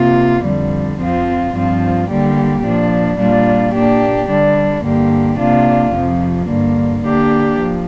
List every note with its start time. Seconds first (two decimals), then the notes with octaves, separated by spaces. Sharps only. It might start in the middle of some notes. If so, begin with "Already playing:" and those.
Already playing: C3 A#3 F4
0.44 F2 D3 G3
0.99 F2 F3 C4 F4
1.54 G2 F3 C4 F4
2.09 D3 G3 A#3 G4
2.63 A#2 F3 D4
3.18 A#2 G3 D4 F4
3.73 A#2 A#3 D4 G4
4.29 D3 G3 D4
4.83 G2 D3 A#3 G4
5.38 C3 A#3 D4 F4
5.93 F2 C3 F3
6.48 G2 D3 A#3
7.02 D3 A#3 D4 G4
7.58 F3